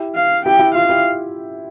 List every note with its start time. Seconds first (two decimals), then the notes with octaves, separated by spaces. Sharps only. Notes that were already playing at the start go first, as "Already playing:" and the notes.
Already playing: E4 G4
0.15 F5
0.45 E4 G4 G5
0.59 E4 G4
0.75 F4 F5
0.89 E4 G4